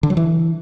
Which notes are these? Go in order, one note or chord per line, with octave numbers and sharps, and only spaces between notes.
D3
F#3
E3